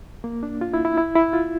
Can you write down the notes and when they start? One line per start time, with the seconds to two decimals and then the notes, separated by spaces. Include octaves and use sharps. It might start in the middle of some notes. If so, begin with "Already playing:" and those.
0.24 A#3
0.43 D4
0.61 F4
0.74 E4
0.85 E4
0.97 E4
1.16 E4
1.33 F4